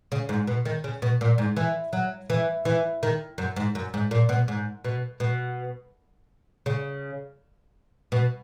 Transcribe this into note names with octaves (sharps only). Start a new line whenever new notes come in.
C#3
G#2
B2
D#3
C#3
B2
A#2
G#2
E3
F#3
E3
E3
D#3
F#2
G#2
F#2
G#2
A#2
B2
G#2
B2
B2
C#3
B2